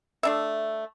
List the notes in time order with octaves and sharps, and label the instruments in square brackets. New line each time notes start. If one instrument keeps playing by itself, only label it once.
[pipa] A3 D4 E5